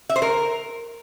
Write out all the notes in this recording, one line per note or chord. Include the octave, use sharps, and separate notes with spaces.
E5
C5
A#4